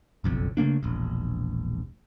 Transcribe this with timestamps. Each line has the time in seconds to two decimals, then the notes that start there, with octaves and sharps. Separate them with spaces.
0.24 F#1 B1 F2
0.57 C#3 A3 A#3 D4
0.83 E1 A#1